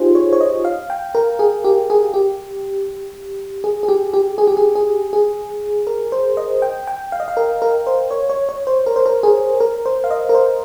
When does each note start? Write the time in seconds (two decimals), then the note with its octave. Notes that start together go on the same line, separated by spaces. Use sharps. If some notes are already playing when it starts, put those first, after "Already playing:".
Already playing: D#4 F4 G4 G#4 C5
0.15 C#5
0.33 C#5
0.41 D#5
0.65 F5
0.90 G5
1.15 A#4
1.39 G#4
1.65 G4
1.90 G#4
2.14 G4
3.64 G#4
3.83 G#4
3.89 G4
4.14 G4
4.38 G#4
4.47 G4
4.57 G#4
4.75 G#4
5.13 G#4
5.87 A#4
6.12 C5
6.37 D#5
6.62 G5
6.87 G5
7.12 F5
7.20 D#5
7.28 F5
7.37 A#4
7.62 A#4
7.87 C5
8.11 C#5
8.30 C#5
8.49 C#5
8.67 C5
8.86 A#4
8.96 C5
9.06 A#4
9.23 G#4
9.61 A#4
9.86 C5
10.04 F5
10.11 D#5
10.29 A#4
10.35 C5